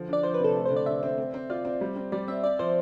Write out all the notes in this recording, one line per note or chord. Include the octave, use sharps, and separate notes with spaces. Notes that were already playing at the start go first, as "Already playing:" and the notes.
Already playing: D3 F3
D4 D5
F3 C5
B4
C3 A4
A3
D3 C5
D5
D3 E5
C4
C4
C4
F4 D5
C4
G3
C4
G3 D5
C4 E5
C4 D5
F3 C5